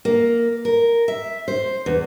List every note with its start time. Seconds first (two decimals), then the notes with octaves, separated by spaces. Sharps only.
0.05 A#3
0.65 A#4
1.08 E5
1.48 C5
1.86 E2